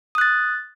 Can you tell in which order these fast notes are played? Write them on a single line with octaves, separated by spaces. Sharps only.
D#6 F#6 A6